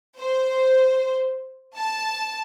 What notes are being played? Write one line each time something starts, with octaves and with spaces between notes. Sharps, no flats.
C5
A5